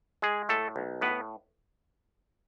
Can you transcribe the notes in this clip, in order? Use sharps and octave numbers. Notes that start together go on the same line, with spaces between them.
G#3 G#4
A2 A3 A4
B1
A2 B3 B4